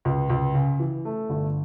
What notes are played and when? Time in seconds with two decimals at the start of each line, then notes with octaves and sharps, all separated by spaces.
0.05 C#2
0.29 C#2
0.55 C#3
0.80 E3
1.05 A3
1.29 G1